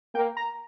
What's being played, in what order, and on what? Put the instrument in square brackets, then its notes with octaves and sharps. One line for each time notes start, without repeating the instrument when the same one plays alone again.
[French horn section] A#3 [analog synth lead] G5
[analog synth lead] A#5